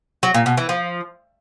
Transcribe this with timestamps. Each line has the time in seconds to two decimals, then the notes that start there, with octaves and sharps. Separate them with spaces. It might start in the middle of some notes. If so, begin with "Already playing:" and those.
0.23 F#3
0.34 A#2
0.46 B2
0.57 E3
0.69 F3